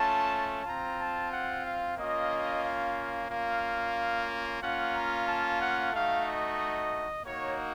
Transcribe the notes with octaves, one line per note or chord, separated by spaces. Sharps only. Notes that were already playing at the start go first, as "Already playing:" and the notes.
Already playing: A3 C#4 F4 A5
C4 F4 A#5
A5
F#5
F5
A#3 C#4 F4 D#5
F5
A#3 C#4 F4
A#3 C#4 F4 F#5
A#5
A5
F#5
A3 D#4 F#4 F5
D#5
A#3 D#4 F#4 C#5